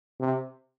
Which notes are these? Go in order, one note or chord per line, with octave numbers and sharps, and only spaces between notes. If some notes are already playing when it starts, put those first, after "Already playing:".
C3